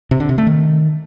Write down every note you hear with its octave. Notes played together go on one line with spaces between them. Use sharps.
C3
D3
C3
A3
D#3